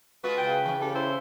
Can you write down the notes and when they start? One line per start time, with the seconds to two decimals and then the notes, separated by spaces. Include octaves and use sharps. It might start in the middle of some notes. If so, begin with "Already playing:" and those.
0.24 G#3 F4 F#4 B4
0.37 C#3 G5
0.65 E3 C#4
0.81 G4 A4
0.95 E4 C5